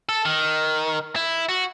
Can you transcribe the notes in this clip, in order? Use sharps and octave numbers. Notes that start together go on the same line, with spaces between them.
A4
D#3
E4
F#4